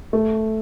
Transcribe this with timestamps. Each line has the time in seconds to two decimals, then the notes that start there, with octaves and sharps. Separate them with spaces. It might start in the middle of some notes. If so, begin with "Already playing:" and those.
0.13 A3